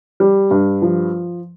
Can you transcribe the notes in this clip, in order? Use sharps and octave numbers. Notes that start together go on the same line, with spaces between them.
G3
G2
F3